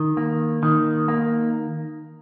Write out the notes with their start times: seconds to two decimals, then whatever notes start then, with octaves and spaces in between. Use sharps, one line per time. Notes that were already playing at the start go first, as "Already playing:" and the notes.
Already playing: D#3
0.17 A#3
0.63 D#3
1.08 A#3